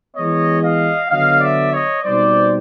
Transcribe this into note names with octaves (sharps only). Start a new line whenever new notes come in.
E3 G#3 B3 C#5 D#5
D#5 F5
D3 F#3 B3 D#5 F5
D5 E5
C#5 D#5
B2 G3 C4 D#4 C5 D5